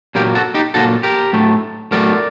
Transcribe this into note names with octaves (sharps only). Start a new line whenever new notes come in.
A#2 F#3 A#3 G4 A#4
F#4 A4
D#4 G4
A#2 F#3 A#3 F#4 A4
G4 A#4
A2 F#3 A3
A2 F#3 A3 A#4 D5